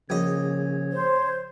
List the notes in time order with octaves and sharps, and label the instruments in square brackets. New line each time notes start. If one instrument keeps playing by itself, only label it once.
[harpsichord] A#1 D#5 [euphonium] C#3 [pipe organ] C#5
[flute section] C5